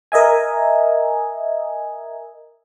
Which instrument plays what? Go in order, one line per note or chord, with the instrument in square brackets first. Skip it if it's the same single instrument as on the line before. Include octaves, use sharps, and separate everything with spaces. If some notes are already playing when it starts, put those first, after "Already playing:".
[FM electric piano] A#4 D#5 E5 G#5